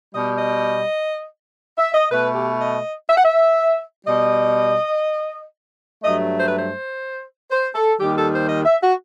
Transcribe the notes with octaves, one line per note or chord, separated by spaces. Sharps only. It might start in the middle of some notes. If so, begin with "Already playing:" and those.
B2 G3 D#5
D#5
E5
D#5
B2 A3 B4
G4
D#5
E5
F#5
E5
B2 G3 D#5
G2 F#3 A3 D#5
C5
B4
C5
C5
A4
D#2 D#3 G3 G4
A4
C5
D#5
E5
F#4